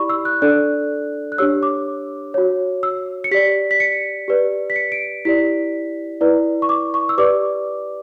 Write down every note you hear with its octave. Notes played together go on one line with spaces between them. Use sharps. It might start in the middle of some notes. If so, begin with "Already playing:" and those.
Already playing: E4 G4 D5 B5 C#6
E6
F#6
D4 A4 D5 F#6
F#6
D4 G4 C#5 E6
D6
F#4 C#5
E6
C#7
G4 D5 B6
B6
C#7
G4 B4 D5
B6
C#7
D7
E4 G4 D5 B6
E4 B4 D5
C#6
D6
C#6
E6
G4 B4 D5 D6